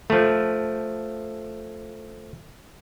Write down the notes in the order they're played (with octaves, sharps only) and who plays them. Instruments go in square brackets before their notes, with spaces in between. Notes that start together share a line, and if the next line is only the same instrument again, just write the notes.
[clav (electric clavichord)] F3 A3